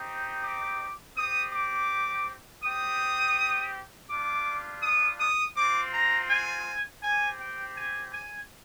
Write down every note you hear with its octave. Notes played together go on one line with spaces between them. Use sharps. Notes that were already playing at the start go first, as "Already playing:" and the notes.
Already playing: C4 D#4 G4
D6
C4 G4 D#6
D6
C4 G4 D#6
G3 D4 F4 D6
D#6
D#6
C4 F4 D6
A#5
G#5
C4 G4 G#5
G5
G#5
G#5